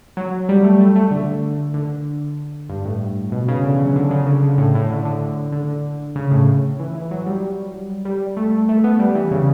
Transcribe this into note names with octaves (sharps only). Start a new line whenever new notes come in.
F#3
G3
A3
A3
A3
D3
D3
G2
A2
B2
C#3
D3
E3
F#3
D3
C#3
D3
C#3
A2
A2
D3
D3
D3
C#3
A2
E3
E3
F#3
G3
G3
A3
A3
A3
B3
G3
E3
C#3